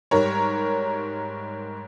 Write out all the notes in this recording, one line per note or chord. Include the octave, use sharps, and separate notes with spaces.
G#2 G3 A#4 C#5